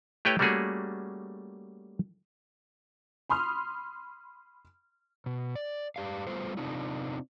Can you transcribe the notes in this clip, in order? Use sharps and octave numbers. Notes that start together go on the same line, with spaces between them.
A3 E4 G4 B4 C#5 G5
G3 A3 A#3 C#4 F#4 G#4
B5 C6 D#6 F6
B2
D5
G2 G4 D5 F5
G3 A3 B3 F4 C5
C3 C4 D4 D#4 F4